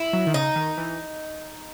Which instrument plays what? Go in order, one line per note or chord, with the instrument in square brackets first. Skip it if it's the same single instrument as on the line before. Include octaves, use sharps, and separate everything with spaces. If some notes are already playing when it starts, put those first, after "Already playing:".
Already playing: [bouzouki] E4
[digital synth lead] F#3
D#3
[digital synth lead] C#3 [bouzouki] D#4
[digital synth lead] D#3
E3